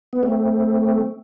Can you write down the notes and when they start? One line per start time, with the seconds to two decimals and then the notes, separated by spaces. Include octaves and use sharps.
0.13 B3
0.23 A3 C4